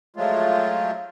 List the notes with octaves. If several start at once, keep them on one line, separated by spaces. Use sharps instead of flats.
F3 F#3 G#3 A3 F4